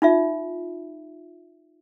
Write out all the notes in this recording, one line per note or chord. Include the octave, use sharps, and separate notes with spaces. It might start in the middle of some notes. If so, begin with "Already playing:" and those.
D#4 F4 E5